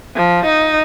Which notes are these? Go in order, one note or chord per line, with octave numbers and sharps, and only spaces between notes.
F3
D#4